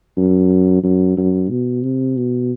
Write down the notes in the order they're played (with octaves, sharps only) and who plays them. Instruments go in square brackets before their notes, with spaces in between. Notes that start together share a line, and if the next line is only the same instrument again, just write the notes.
[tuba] F#2
F#2
F#2
B2
C3
B2